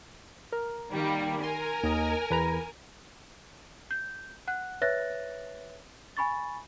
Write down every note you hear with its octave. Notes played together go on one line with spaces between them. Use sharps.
A#4
D#3 G3 A#3
A#4 G#5 C6
D#2 D#5
E2 B4 A#5
G6
F#5 F#6
B4 C#5 E5 F#6 A6 A#6
G#5 B5 C#6 A6